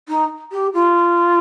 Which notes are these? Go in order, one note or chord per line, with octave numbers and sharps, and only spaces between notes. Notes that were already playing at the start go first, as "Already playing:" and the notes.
D#4
G4
F4